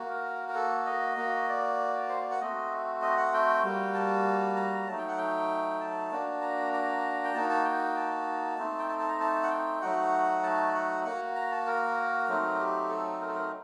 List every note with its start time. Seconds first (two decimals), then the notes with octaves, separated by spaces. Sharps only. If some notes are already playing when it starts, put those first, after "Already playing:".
Already playing: A#3 F#4
0.09 A#4
0.49 A#4
0.55 A4
0.86 D#5
1.17 A#3 F#4
1.48 D5
2.09 C5
2.20 D5
2.31 F#5
2.41 A3 C4 F#4 D#5
3.02 D#5
3.17 F#5
3.34 G5
3.63 G3 A#3 F#4
3.94 A5
4.56 A#5
4.87 F#3 A3 D#4 A5
4.98 G5
5.08 F#5
5.18 G5
5.80 A5
6.11 A#3 D4 F#4
6.41 A#5
6.73 A#5
7.24 G5
7.34 A#3 D#4 F#4 A5
7.49 A5
7.65 G5
7.96 A5
8.58 A3 C4 D#4
8.79 G5
8.89 A5
8.99 A5
9.09 A#5
9.20 A5
9.43 F#5
9.50 G5
9.82 F#3 A3 D#4 F#4 F#5
10.43 A5
10.74 F#5
11.04 A#3 F#4 F#5
11.35 A#5
11.51 A5
11.67 A#4
12.29 F#3 A3 C4 D#4
12.59 G4
12.89 A4
13.21 A#4
13.28 A4
13.35 A#4